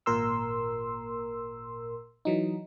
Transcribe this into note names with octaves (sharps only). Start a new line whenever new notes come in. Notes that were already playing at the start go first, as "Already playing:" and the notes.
G#1 A#2 A#4 C6 E6
E3 F#3 D#4